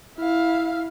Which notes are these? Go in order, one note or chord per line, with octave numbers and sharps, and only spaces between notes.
E4 F5